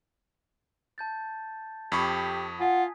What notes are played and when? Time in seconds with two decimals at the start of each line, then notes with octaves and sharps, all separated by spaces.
0.98 A5 G6 A6
1.92 F2 G4 B5 C#6 D#6 G#6 B6
2.60 F4 F#5 G#5